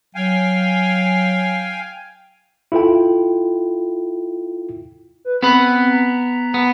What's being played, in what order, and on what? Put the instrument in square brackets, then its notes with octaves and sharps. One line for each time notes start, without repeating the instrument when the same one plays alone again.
[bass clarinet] F#3 [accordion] F5 G5 G#5
[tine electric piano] E4 F4 A4 G5
[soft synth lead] B4
[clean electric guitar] B3 B4 B5 [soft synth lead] C4
[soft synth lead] A#5
[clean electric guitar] B3